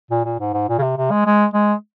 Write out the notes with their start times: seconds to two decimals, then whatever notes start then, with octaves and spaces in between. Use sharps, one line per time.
0.10 A#2
0.25 A#2
0.40 G#2
0.54 G#2
0.69 A#2
0.79 C#3
0.82 C3
0.97 C3
1.11 G#3
1.26 G#3
1.54 G#3